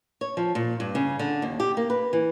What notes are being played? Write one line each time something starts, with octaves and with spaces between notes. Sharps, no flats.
C#5
F3
A#2
G2
C#3
D3
D#2
G4
A#3
B4
E3